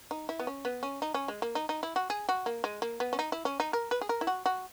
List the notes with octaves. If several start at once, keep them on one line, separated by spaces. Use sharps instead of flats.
D#4
E4
B3
C#4
B3
C#4
D#4
C#4
G#3
A#3
D#4
D#4
E4
F#4
G#4
F#4
A#3
G#3
A#3
B3
C#4
D#4
E4
C#4
D#4
A#4
B4
G#4
A#4
E4
F#4
F#4